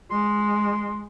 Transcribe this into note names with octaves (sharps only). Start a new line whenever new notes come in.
G#3 C6